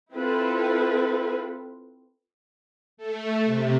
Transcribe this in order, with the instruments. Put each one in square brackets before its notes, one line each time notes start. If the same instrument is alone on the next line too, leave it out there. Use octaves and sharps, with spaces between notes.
[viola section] C4 E4 F4 A4 B4
[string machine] A3
C3